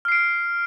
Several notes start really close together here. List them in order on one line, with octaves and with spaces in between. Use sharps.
F6 C7 D7